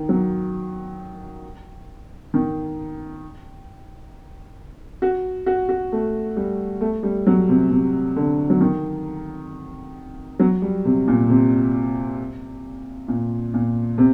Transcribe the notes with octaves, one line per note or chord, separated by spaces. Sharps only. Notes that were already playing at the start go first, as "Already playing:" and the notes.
Already playing: D#3
F#3
D#3
F#4
F#4
F#4
A3
G3
A3
G3
F#3
C3
C3
D3
F#3
D#3
F#3
G3
C3
A#2
C3
A#2
A#2
C3